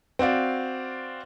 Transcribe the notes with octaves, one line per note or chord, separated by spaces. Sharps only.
C4 F#4 D5 F5